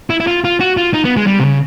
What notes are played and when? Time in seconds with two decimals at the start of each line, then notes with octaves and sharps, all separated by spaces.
0.10 E4
0.20 E4
0.27 F4
0.44 F4
0.60 F#4
0.77 F4
0.93 D#4
1.05 B3
1.17 G#3
1.27 G3
1.39 C3
1.44 C#3